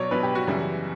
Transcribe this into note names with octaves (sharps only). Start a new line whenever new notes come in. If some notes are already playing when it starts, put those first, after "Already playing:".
Already playing: B2 F#3 C#5 D5
B2 F#3 B4
G4
F#4
F#2 C#3 E3 G3